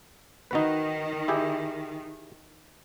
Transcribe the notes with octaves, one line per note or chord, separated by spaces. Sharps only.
D#3 D#4 F#4 B4
E4 G4 G#4